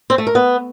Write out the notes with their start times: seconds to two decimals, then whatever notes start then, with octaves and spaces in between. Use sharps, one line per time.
0.10 C4
0.18 A3
0.27 A#4
0.35 B3